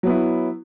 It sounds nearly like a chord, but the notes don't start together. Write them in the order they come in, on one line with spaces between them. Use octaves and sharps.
F#3 B3 E4